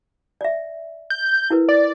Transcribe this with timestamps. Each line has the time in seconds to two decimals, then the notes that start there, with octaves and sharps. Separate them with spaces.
0.41 D5 E5
1.10 G6
1.50 E4 A#4 B4
1.69 D5